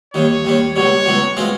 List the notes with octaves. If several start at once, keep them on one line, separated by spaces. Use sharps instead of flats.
D#2 D#3 G3 C#5
D#2 D#3 G3
C#2 B2 G3 C#5
C#2 B2 G3
B2 G#3 C4 F4